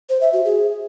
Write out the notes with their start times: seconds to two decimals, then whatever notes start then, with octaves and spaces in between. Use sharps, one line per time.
0.09 C5
0.21 E5
0.33 F#4
0.45 G#4